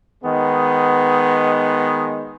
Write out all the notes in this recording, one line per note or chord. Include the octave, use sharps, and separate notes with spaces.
D#3 G#3 B3